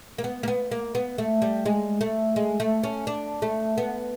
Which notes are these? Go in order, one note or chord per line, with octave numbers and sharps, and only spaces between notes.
A#3
B3
A#3
B3
A#3
B3
A3
G3
G#3
A3
G#3
A3
C#4
D4
A3
B3